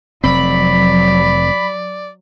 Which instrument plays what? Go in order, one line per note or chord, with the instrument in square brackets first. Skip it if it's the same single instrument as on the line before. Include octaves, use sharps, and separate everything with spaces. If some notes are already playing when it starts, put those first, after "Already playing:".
[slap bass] F1 C3 C4 [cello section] F#3 [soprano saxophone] D5 [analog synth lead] B5